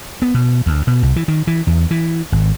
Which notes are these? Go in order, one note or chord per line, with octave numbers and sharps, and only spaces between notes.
B3
B2
D2
B2
C2
E3
D#3
E3
E2
E3
G#1